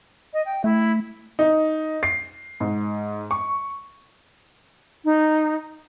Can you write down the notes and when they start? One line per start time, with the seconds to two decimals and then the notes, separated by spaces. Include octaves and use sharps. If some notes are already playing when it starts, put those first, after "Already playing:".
0.33 D#5
0.45 G5
0.64 A3 E4
1.39 D#4
2.03 C7
2.60 G#2
3.31 C#6
5.05 D#4